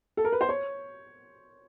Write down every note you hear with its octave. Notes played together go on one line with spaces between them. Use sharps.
A4
A#4
B4
C5
C#5